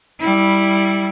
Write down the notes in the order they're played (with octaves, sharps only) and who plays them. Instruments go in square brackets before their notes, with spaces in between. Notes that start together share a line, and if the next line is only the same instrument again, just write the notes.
[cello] G3 E4